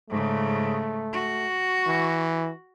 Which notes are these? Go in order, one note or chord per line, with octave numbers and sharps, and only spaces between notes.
G#2 C#3 A3
F#4
E3